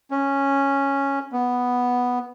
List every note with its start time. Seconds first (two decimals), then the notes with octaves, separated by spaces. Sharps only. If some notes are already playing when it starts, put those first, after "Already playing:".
0.11 C#4
1.32 B3